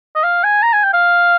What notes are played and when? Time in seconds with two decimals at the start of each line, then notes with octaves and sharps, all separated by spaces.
0.15 D#5
0.24 F5
0.44 G#5
0.62 A#5
0.73 G#5
0.83 G5
0.93 F5